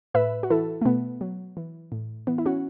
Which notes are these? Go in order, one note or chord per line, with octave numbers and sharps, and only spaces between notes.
A2 B4 E5
F#4
E3 E4 A4
A3
B2 B3
F#3
E3
A2
E3 B3
E4
C#4 F#4